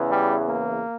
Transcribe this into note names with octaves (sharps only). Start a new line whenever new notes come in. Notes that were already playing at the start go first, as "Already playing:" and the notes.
Already playing: E2 C#3 E3
G3
A#3